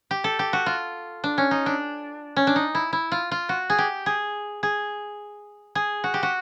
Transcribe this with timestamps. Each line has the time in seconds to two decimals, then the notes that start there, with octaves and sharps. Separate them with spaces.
0.11 G4
0.24 A4
0.39 G4
0.53 F#4
0.66 F4
1.24 D4
1.38 C#4
1.51 D#4
1.66 D4
2.36 C#4
2.47 D4
2.56 D#4
2.75 E4
2.93 E4
3.12 F4
3.31 F4
3.49 F#4
3.70 G#4
3.78 G4
4.06 G#4
4.63 G#4
5.75 G#4
6.04 F#4
6.14 G4
6.23 F#4